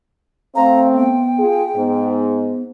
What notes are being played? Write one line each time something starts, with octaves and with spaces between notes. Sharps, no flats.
A3 C4 F5 A#5
B3 G5
F4 G#4
G#2 B3